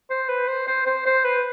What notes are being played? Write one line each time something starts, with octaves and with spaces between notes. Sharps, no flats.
C5
B4
C5
C5
C5
C5
B4